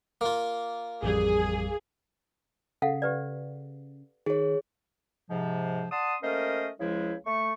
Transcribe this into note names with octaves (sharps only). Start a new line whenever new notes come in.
A#3 F4
A1 F2 G3 G#4
C#3 A4 F5 F#5
G4 B4 D5
D#3 G#4 C#5
G#2 C3 F3
D5 F#5 A5 C6 D#6
A3 A#3 C#4 A#4 C5 D#5
C#2 C#3 F3 G#3 E4
A3 C#6